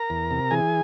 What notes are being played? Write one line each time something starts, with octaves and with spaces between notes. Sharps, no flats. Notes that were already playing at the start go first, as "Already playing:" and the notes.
Already playing: A#4 A#5
E2
C3
E3 G#4 G#5